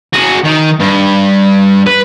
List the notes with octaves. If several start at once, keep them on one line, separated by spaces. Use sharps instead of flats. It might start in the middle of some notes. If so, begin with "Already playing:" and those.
F#4 G#4
D#3
G2
B4